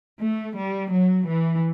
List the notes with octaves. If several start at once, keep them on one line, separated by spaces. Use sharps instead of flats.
A3
G3
F#3
E3